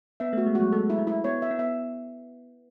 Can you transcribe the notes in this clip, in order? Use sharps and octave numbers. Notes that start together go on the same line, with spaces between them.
B3 E5
A3 F#4
G#3
F#3 F#4
G#3 A4
E4
G#3
E4
B3 C#5
E5
B3
E5